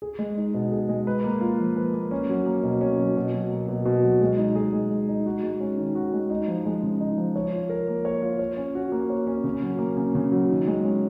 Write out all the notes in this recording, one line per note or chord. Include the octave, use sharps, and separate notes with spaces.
G#4
G#3
D#4
B2
G#4
G#3
B4
A#3
F4
F3
B4
A#3
C#4
F#3
A#3
B2
C#4
F#3
B2
F#3
A#3
B2
B2
F#3
G#3
D#4
G#4
G#3
G#3
D#4
F#4
G#3
C#4
D#3
F#4
G#3
D#4
F3
G#3
C#3
D#4
F3
C#5
F4
A#4
A#3
C#5
F4
C#5
C#4
F#4
A#3
C#5
C#4
C#3
F#3
A#3
C#3
C#3
F#3
D#3
G#3
C#4